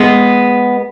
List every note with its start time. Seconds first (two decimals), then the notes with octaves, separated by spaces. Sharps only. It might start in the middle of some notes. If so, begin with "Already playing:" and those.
Already playing: G#3 B3